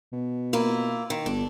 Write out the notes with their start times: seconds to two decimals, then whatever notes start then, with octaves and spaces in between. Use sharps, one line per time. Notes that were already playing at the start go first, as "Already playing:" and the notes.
0.12 B2
0.53 A#3 E4 F4
1.10 D#3
1.26 G1 D4